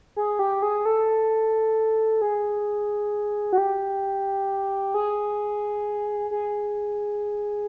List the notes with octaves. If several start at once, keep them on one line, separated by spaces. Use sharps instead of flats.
G#4
G4
G#4
A4
G#4
F#4
G4
G#4
G#4